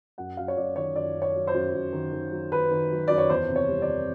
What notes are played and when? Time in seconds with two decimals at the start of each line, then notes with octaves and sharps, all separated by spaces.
0.18 F#2 F#5
0.37 F#2 F5
0.48 C#5
0.57 F#2 D5
0.76 D#3 C#5
0.95 F#2 D5
1.15 F#2
1.22 C#5
1.35 F#3
1.47 C5
1.54 F#2
1.73 F#2
1.93 D#3
2.12 D#3
2.31 F#3
2.51 D#3 B4
2.71 D#3
2.91 F#3
3.08 F#2 D5
3.18 C#5
3.30 E2 C5
3.49 C3
3.56 C#5
3.68 G3
3.82 D5
3.87 E2